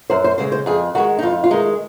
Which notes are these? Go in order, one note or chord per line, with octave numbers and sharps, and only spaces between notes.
F#2 C5
C5
C#3 G#3 C5
C5
F2 G#4
D#3 G#3 F#4
D#4
F2 F4
F4
D#3 G#3 D#4